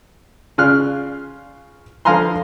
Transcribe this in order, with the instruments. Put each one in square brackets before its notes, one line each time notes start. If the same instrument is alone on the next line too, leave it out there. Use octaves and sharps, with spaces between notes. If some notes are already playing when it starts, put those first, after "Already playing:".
[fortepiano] C#3 F4 F6 F#6
D3 F3 F5 G#5 A#5 C6